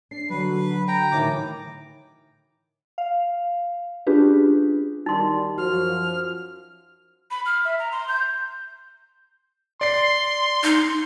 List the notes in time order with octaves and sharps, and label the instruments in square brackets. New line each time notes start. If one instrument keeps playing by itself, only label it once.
[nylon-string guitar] D4 [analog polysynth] C7
[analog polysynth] D3 F#3 [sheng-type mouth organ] B4
[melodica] G5 A#5
[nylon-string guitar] A2 D#3 E3 [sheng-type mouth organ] D6
[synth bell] F5
C#4 D4 F4 G4 G#4 B4
[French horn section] D#3 G3 [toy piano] D#4 C6
[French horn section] F#2 F3 [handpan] F#4 [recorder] F6
[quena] B5
F6
E5
A#5
C6
G6
[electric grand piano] D5 C7 [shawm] C6
[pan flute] D#4